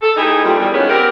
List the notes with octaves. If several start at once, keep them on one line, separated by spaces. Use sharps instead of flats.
A4
E3 A3 D#4 G4 G#4
F2 A#2 D3 G3
E2 D#3 G3
D#3 F3 G#3 A#3 B3 C#4
B3 C4 G4 A#4